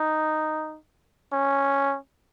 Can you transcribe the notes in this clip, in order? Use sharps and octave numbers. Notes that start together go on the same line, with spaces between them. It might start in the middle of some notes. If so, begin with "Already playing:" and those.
Already playing: D#4
C#4